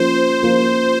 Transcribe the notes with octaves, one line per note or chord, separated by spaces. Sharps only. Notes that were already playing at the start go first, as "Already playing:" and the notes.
Already playing: F3 A#3 C#4 F4 C5
F3 A#3 C#4 F4